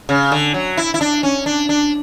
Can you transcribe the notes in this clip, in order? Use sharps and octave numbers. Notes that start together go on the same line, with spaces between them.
C#3
D3
F#3
E4
E4
D4
C#4
D4
D4